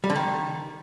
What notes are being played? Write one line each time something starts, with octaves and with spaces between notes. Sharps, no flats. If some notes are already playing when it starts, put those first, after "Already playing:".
G3
D3
D#3